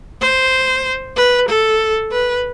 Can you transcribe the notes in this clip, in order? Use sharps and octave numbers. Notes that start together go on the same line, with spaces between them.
C5
B4
A4
B4